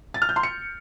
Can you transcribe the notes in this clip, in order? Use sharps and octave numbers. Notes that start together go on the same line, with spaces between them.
A6
F6
G6
C6
C#7